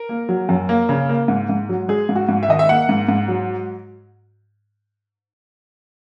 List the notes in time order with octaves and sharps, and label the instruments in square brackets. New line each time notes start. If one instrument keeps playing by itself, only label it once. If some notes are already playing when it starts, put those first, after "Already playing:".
Already playing: [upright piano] A#4
A#3
F#3
F#2
A#3
C#3
A#3
G#2
G#2
F#3
G#3 G#4
G#2
F#4
G#2
E5
D#3 D#5
E5
A#3 F#5
G#2
G#2
F#3